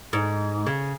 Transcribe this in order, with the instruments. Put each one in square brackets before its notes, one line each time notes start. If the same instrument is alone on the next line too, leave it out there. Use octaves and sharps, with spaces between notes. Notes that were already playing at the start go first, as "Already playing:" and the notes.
[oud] G#2
C#3